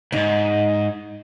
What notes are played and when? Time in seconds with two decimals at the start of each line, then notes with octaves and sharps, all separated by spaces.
0.12 C#2 G#2 D#4